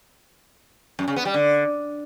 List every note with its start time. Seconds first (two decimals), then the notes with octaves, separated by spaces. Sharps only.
0.99 F#2
1.08 C#3
1.16 B3
1.25 G3
1.34 D3